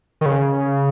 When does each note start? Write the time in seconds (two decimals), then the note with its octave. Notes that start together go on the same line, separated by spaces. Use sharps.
0.21 D#3
0.26 C#3